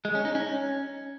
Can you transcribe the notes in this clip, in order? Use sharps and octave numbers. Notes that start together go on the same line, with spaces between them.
G#3
C#4
D#4
C#4